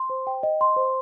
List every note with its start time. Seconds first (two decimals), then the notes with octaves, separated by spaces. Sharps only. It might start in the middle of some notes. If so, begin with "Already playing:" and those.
Already playing: C6
0.10 C5
0.27 G5
0.43 D#5
0.61 C6
0.76 C5